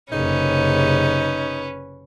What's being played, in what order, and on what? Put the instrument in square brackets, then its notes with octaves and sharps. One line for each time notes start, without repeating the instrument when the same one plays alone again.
[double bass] F#1 C3 [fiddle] C#4 B4 [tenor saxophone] D#4